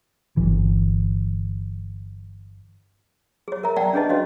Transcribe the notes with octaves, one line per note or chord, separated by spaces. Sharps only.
G1 E3
G#4 C#5
A#4 E5 A#5
D5 E5 F#5 G5 A5 A#5
C#4 D4 G#4 B4 D#5 A5
F#4 C#5 D#5 F5